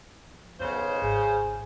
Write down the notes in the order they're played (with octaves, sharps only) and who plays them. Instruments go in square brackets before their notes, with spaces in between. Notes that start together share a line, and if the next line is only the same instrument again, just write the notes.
[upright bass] F3
[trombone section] B1 [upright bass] F#2 [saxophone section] C#3 C5
[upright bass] G#1 [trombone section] G#4